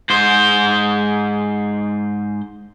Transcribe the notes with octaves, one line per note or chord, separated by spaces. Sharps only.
G#2 C5